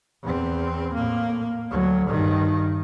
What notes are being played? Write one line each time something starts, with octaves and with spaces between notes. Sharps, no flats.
E2 C4
A2 A#3
D2 F#3
G2 D#3